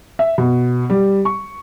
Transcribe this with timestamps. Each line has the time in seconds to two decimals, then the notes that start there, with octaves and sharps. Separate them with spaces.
0.19 E5
0.38 B2
0.90 G3
1.25 C#6